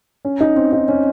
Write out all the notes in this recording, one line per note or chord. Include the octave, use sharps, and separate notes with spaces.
C#4
D#4
C4
D#4
C#4